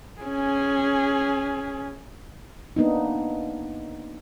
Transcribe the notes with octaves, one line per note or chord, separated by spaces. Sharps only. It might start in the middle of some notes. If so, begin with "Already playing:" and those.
C#4 G#4
A#3 B3 D4 D#4